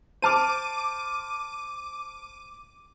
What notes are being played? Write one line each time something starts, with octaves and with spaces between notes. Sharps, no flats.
C5 A5 D6 F6 D#7